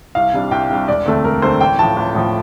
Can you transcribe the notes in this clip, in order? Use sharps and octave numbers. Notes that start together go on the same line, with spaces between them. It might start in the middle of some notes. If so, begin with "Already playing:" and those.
C2 F5
C3 G3 D4
C2 G5
C3 G3 D4
E1 D5
D2 D3 A3 C4
E1 A#4
D2 D3 A3 C4 C5
A1 G5
A2 F3 A5
A1
A2 F3